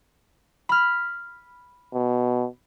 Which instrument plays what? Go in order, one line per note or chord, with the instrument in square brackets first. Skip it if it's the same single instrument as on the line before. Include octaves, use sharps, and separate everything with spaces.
[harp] B5 F6
[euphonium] B2